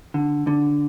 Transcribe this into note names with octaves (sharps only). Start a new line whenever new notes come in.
D3
D3